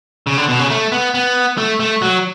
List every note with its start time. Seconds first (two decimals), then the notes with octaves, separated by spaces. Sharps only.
0.27 C#3
0.37 D3
0.49 B2
0.59 C#3
0.70 A3
0.92 B3
1.14 B3
1.57 A3
1.80 A3
2.02 F#3